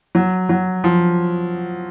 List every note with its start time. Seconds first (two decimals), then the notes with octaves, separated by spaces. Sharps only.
0.15 F#3
0.49 F#3
0.84 F3